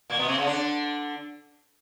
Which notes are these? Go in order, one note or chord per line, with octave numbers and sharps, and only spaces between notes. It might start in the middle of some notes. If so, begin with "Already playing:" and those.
A#2 A#3
B2 B3
C3 C4
C#3 C#4
D3 D4